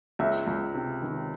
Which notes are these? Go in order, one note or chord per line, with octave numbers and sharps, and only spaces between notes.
C#2 E5
C#2
C3
D#3